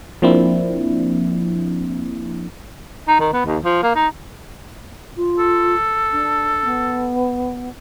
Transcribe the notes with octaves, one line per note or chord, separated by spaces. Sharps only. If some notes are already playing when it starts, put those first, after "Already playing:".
F3 A#3 C4 D4 E4
D#4
D#3
B3
D#2
F3
A#3
D#4
F4
A4
D4
B3